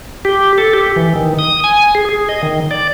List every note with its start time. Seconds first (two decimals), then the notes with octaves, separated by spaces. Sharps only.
0.25 G4
0.58 A4
0.73 G4
0.96 E3
1.15 D#3
1.39 D#6
1.64 G#5
1.95 G#4
2.09 G#4
2.29 D#5
2.43 D#3
2.71 D5